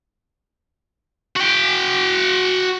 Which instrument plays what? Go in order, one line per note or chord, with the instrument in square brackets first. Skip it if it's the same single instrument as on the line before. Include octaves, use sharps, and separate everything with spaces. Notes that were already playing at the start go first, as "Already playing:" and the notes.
[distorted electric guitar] F#4 G5